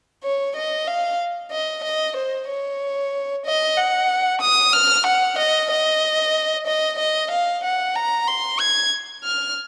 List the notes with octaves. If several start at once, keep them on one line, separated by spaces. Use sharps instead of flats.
C#5
D#5
F5
D#5
D#5
C5
C#5
D#5
F#5
D#6
F6
F#5
D#5
D#5
D#5
D#5
F5
F#5
A#5
C6
G#6
F6